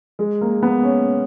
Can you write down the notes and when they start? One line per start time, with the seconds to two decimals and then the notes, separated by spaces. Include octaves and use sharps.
0.19 G#3
0.41 A#3
0.63 B3
0.84 C#4